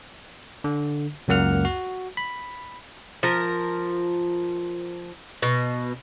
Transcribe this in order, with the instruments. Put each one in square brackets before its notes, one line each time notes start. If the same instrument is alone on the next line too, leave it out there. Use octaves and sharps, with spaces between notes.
[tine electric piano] D3
C#2 F#2 A#3 F#5 F6
F#4
B5
[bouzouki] F3 A#4
B2